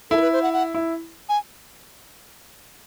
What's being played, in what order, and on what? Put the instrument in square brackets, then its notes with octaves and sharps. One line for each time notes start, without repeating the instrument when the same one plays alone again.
[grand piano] E4 [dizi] A4
[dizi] A#4
B4
C5
F#5
F#5
[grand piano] E4
[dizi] G#5